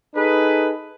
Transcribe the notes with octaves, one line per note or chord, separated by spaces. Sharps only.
D#4 G#4 A4 B4